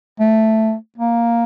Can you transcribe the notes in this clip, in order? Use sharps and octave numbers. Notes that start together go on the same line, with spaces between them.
A3
A#3